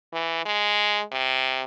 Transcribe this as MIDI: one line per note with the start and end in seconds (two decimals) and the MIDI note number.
0.14 0.42 52
0.46 1.03 56
1.12 1.64 48